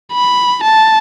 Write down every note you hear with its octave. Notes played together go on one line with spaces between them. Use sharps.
B5
A5